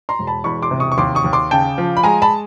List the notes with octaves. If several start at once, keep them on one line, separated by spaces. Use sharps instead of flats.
A#5 C6
E1
A5 B5
E2 B5 C#6
C6 D6
C3
C#6 D#6
C#6
D#2 C6 D6
C#6 D#6
D#2
C6 D6
C#3 G5 A5
F3
B5
G#3 G#5 A#5
A5 B5